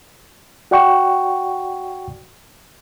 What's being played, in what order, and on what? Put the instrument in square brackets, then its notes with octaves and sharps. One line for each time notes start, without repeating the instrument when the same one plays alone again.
[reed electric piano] F#4 D5 F#5 G5 C#6